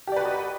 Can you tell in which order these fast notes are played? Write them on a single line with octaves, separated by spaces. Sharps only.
G4 D5 B4 F#4 D#5